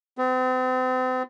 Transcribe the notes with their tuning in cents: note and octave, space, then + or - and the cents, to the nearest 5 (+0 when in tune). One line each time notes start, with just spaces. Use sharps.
C4 -40